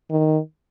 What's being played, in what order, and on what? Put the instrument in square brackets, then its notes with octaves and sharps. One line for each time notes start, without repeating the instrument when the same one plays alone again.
[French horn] D#3